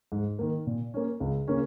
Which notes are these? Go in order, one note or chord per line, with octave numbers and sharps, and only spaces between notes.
G#2
D#3 A#3
A#2
A#3 C#4
C#2
C#3 A#3 C#4